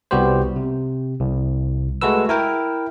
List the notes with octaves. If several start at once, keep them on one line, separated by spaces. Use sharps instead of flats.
C2 G3 B3 F#4 G4 C5
C3
C2
G#3 A3 F#4 A4 B4 E6
E4 A#4 G5